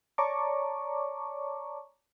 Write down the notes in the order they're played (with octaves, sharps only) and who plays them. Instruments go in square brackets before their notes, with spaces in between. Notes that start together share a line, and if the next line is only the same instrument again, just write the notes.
[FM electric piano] C#5 D5 A5 A#5 C#6 D6